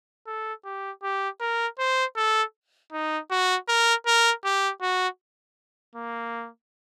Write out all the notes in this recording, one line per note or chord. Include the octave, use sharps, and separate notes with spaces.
A4
G4
G4
A#4
C5
A4
D#4
F#4
A#4
A#4
G4
F#4
A#3